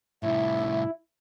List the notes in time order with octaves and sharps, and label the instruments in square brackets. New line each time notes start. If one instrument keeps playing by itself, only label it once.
[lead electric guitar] C2 A2 [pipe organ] E4 [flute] E5